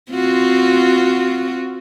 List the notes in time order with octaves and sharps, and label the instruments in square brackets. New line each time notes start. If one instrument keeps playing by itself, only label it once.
[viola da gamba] C4 F4 F#4